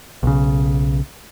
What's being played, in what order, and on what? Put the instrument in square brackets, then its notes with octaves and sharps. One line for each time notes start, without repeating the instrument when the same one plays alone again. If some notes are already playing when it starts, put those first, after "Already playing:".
[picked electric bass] B1 C#3